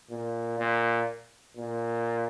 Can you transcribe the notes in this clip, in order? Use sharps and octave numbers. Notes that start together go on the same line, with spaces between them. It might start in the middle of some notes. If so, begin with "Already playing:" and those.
A#2
A#2
A#2